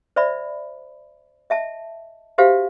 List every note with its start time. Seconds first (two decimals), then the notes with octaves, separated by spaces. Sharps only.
0.16 C5 D5 E5 B5
1.50 D#5 E5 A5
2.38 F#4 G4 C5 E5 F5